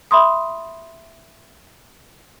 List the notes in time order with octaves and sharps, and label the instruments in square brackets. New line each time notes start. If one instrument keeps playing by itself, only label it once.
[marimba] E5 B5 C6 D#6